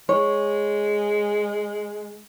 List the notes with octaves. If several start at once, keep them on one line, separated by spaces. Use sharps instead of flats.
G#3 C#5